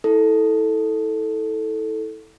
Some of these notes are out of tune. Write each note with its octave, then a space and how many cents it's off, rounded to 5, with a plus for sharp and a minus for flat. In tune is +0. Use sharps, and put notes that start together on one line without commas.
E4 -25 A4 +0